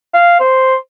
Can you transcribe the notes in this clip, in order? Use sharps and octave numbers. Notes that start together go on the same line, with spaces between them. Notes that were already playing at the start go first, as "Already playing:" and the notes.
F5
C5